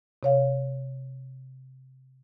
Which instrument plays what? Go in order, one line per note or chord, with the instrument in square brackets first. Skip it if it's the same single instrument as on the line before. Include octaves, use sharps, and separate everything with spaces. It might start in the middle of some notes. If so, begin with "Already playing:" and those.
[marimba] C3 C#5 F5